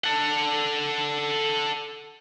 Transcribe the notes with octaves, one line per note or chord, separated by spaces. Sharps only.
A4 F#5